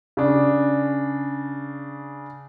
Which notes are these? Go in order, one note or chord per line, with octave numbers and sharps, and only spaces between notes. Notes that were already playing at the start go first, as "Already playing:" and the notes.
C#3 D4